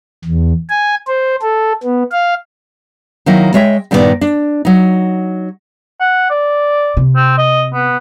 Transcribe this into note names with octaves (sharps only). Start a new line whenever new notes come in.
E2
G#5
C5
A4
B3
F5
D#3 F#3 A#3 D#4 E4
G#3 C#5 E5 G5
G2 A#2 D#3 B3 A4 D5
D4
F#3 D#4
F#5
D5
C3
C4
D#5
B3